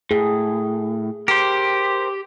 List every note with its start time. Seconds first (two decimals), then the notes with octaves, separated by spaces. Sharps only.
0.11 A2 G#4
1.28 G4 A#4 C5